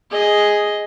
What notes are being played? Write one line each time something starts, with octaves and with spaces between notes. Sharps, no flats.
G#4 D#5